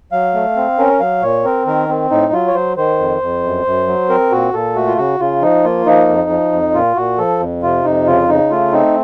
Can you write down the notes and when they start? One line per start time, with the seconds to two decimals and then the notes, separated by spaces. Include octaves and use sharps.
0.12 F#3 F5
0.34 A3
0.56 C4
0.78 C#4 A#4
1.00 F#3 F5
1.22 A#2 C#5
1.45 C4 A#4
1.67 D#3 A#4
1.89 C4
2.11 A2 D#4
2.33 F#3 F4
2.48 C#5
2.55 F#3 C5
2.77 D#3 C5
2.99 F2
3.21 F2
3.44 F#2
3.65 F#2
3.87 F#3
4.09 C4 A#4
4.32 A#2 F#4
4.53 A#2 A4
4.76 A3 F#4
4.87 F4
4.98 C#3 F#4
5.20 C#3 F4
5.42 F3 D#4
5.64 A#3 F4
5.86 F3 D#4
6.08 F2
6.30 F3
6.52 F2
6.74 A#2 F4
6.96 A#2 F#4
7.18 F3 A4
7.40 F2
7.63 C3 F4
7.85 F2 D#4
8.07 C#3 F4
8.29 C#3 D#4
8.51 A3 F4
8.73 C4 D#4